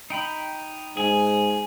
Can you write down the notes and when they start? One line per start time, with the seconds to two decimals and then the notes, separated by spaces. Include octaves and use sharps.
0.10 D#4 G5 B5
0.97 G#2 G#4 G#5